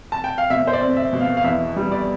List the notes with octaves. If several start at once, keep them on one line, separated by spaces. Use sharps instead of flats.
A5
G5
F5
B2 E5
C5
D5
C4
E5
B2
F5
F5
E2 E5
G3
D5